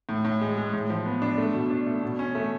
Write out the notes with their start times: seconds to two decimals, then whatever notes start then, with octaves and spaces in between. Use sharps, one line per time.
0.09 A2
0.25 A2
0.41 G#3
0.57 G#3
0.73 A2
0.90 F3
1.06 B3
1.22 D4
1.38 A3
1.54 B2
1.70 D4
1.87 A3
2.02 B2
2.19 C#4
2.35 A3